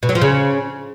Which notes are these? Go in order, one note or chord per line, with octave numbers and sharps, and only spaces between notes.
B2
F#3
F3
C#3